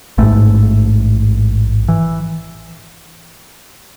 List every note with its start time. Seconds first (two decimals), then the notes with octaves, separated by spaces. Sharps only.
0.18 A1 G#2 A3
1.88 E3